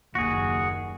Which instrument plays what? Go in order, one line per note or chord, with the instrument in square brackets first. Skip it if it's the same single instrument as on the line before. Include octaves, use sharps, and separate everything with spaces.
[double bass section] F#1 D#2 [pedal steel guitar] F#4 G#4